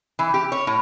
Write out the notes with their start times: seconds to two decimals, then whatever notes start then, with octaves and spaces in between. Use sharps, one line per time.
0.19 E3
0.34 G4
0.52 C#5
0.67 A2